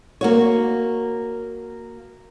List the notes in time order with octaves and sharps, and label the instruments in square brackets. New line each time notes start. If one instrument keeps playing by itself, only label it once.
[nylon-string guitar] A#3 F#4 C#5